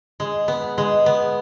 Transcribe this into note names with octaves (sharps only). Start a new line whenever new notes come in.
G#3
B3
G#3
B3